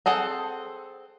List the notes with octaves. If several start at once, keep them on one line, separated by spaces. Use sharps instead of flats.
C4 G#4 A4 F#5